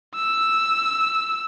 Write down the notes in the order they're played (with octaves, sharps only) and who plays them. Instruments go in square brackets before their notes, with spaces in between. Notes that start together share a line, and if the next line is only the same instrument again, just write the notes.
[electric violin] E6